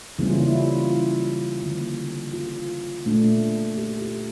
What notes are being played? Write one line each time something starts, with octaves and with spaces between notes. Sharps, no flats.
C#3 E3 G3 A#3 C#4 E4
F4
E4
F4
F4
D3 F3 A#3
F4
A#2 A3 D4
G4
F4